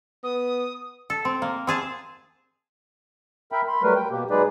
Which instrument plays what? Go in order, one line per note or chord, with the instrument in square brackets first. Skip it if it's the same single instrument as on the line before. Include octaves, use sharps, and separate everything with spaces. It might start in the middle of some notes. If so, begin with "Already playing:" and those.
[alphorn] B3 [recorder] D#6
[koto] A4
C4
A#3
C4 G#4 A5
[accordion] A#4 E5 G5 B5
B5 C6
F#3 G3 A3 A#4 B4
G5
B2 A#3 G4
F#3 G#3 D#4 G#4 B4 D5